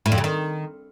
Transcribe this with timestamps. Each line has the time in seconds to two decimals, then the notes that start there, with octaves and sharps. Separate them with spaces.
0.06 A2
0.12 F2
0.18 C#3
0.24 D#3